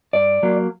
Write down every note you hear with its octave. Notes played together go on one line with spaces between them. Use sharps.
G2 D5
F#3 A#3